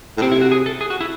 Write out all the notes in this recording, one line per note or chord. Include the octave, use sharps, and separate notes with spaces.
A2
C3 C4
E4
F#4
G#4
A4
G#4
F#4
E4